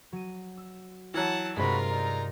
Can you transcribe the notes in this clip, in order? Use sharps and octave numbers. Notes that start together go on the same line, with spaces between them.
F#3 D#7
E6
E3 F#3 F#5 A5 F6 G#6
G2 C3 G#3 C4 F4 F#4 A#4 B5
D#4 D5 A#5